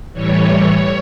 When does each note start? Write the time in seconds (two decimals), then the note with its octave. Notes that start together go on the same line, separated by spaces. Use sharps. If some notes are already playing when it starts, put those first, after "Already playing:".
0.13 A2 E3 G3 C#5